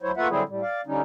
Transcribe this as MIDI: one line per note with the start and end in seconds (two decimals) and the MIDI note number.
0.02 0.11 38
0.02 0.11 54
0.02 0.11 64
0.02 0.11 72
0.02 0.11 73
0.17 0.28 57
0.17 0.28 58
0.17 0.28 65
0.17 0.28 71
0.17 0.28 76
0.17 0.28 78
0.30 0.43 50
0.30 0.43 54
0.30 0.43 55
0.30 0.43 60
0.30 0.43 64
0.30 0.43 68
0.49 0.61 45
0.49 0.61 55
0.62 0.81 74
0.62 0.81 77
0.87 1.02 50
0.87 1.02 55
0.87 1.02 61
0.87 1.02 63